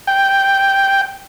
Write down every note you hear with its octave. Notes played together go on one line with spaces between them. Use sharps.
G5